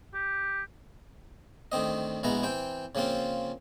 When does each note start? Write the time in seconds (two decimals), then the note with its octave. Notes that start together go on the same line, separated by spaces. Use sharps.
0.14 G4
1.72 D2 D#3 C4 D#5
2.23 A#1 B2 G#3 B3 E4 A#5
2.43 E3 C4 G5
2.95 C#3 F3 A#3 C4 F4